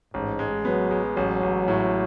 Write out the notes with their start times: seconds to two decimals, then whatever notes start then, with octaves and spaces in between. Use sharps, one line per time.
0.14 A1 G#2
0.39 G#3
0.65 F#3 B3
0.91 G#3
1.16 A1 F#3
1.43 A1
1.68 A2